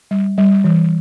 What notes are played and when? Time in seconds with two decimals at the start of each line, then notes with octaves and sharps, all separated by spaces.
0.11 G3
0.38 G3
0.64 E3